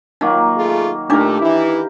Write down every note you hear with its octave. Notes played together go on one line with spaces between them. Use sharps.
D#3 F#3 A#3 D#4
A3 F4 G#4
A#2 A3 D4 D#4 G4 A#4 D6
E3 E4